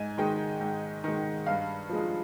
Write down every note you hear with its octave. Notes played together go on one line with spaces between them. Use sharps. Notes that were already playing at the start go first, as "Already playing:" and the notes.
Already playing: G#2 G#5
D#3 G#3 G5
G#2
D#3 G#3
G2 F5
F3 G#3